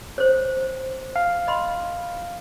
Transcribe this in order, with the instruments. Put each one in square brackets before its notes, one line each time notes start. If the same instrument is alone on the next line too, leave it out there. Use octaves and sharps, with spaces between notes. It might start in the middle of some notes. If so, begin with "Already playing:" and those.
[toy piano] C5 C#5
[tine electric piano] F5 [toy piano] A5
[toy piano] D#5 B5 C6